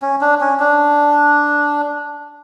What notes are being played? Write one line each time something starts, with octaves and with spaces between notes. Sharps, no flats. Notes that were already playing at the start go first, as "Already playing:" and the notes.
C#4
D4
C#4
D4